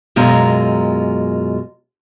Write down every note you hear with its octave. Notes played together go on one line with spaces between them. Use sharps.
F#2 B2 G#3 F4 A#5